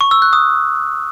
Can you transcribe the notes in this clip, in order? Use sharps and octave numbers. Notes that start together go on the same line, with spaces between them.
C#6
E6
F#6
D#6